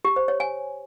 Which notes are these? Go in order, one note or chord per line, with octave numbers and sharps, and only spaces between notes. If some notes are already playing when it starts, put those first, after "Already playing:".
G4
C5
C#5
G#5